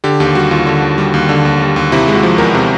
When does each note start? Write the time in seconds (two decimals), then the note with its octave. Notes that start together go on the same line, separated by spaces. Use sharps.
0.04 D3 G4
0.20 D#2 G4
0.35 G3 F#4
0.51 D#2 F4
0.66 D3
0.82 D#2
0.98 G3
1.14 D#2
1.29 D3
1.45 D#2
1.61 G3
1.76 D#2
1.92 C3 E4
2.08 G#3
2.15 F#4
2.23 F3
2.38 E2 A#4
2.54 C3